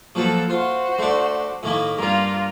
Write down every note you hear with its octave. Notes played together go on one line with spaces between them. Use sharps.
F3 F#3 A#3 A4 B4
F4 F#4 C5
A3 D4
A2 D#3 A#3
G2 A#3 F4 A#4